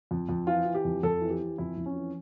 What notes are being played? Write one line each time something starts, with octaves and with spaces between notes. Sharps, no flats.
F2
F2
E3 F4
E3
G4
F2
F2 A4
E3
G4
E3
F2 E4
F2
C#4
E3